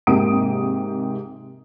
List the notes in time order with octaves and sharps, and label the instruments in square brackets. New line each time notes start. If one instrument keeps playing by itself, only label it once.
[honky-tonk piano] G#2 C3 A#3 G4 D#6 D7